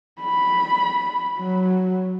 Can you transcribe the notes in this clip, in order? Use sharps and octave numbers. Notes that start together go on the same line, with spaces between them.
B5
F#3